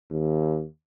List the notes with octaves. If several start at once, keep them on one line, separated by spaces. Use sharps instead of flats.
D#2